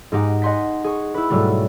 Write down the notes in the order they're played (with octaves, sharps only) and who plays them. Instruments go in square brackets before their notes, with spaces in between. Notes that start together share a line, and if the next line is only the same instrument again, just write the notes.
[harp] G#2 G#3 D#4 G4 F#5
D#5 F#5 G#5 C6 G6 B6
G#4 C#6
E4 B4
G#2 B2 F#3 G3 A3